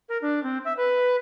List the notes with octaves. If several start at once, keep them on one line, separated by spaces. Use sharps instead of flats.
A#4
D4
C4
E5
B4